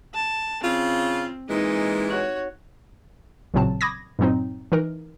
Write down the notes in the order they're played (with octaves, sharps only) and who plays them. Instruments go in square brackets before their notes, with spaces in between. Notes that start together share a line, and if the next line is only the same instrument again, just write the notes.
[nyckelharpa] A5
[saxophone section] C#3 F4 [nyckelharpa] C4
[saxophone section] A#2 E3 G#3 [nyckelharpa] D#4
[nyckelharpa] F#4 C#5
[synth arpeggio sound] A1 A#2 C#3 F#3 C4 A5
B5 D6 D#6 G#6 A#6
G2 A#2 F#3 C4 D#4
E3 D#4 A#4